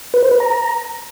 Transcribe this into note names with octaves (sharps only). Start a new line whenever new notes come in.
B4
C5
B4
A#5